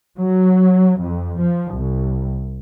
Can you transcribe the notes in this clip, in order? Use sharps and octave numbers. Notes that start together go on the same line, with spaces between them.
F#3
F2
F3
C2